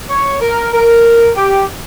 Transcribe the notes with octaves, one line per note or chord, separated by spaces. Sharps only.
C#5
A#4
A#4
G4